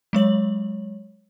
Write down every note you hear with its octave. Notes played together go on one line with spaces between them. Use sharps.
F#3 G#3 C#5 F#7